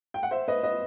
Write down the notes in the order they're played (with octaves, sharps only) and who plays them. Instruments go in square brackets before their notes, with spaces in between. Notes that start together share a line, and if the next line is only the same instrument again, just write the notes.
[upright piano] G5
F#5
C5 E5
B4 D#5
B4 D#5